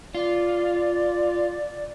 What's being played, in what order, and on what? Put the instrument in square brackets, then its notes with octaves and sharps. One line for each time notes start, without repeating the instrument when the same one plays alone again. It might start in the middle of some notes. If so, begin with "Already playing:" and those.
[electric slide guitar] F4 [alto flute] D5